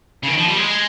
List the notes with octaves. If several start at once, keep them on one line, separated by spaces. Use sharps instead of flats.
C#3
D#3
F3
G3
G#3